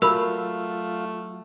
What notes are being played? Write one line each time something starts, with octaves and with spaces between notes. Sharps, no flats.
F#3 A3 F4 A#4 B5 E6